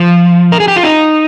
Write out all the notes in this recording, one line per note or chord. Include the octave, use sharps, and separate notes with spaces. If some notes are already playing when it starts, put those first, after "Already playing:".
Already playing: F3
A#4
G#4
G4
F4
D#4